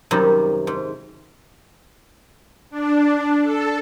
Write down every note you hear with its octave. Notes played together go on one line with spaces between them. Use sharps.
F#2 C3 D#3 G3
G#2
D4
A4